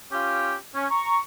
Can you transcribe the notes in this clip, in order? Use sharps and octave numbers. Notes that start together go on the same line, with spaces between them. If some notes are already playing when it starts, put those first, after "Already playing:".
C#4 F4 G4
C#4
A#5 C#6